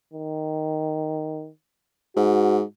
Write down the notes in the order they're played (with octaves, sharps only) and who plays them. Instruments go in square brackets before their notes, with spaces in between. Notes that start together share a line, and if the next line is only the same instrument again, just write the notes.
[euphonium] D#3
[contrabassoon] G#2 [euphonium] F#4